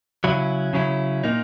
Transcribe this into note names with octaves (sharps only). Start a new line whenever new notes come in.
C#3 F#3 C#4 E4
C#3 F#3 C#4 E4
A#2 A#3 D#4